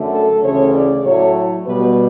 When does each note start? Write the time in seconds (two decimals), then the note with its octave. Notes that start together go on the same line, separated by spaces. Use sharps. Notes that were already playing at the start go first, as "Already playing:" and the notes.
Already playing: F#2 D3 A3
0.12 A4
0.43 D2 C#3 E3 A3 C#5
0.74 D5
1.04 A2 F#3 A3 C#5
1.67 B2 G3 B4